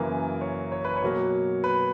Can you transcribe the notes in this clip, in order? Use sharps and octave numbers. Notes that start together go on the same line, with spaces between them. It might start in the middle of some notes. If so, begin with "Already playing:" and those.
Already playing: F#2 C#3 E3 A#3
C#5
C#5
B4
C#5
B2 F#3 A#3
B4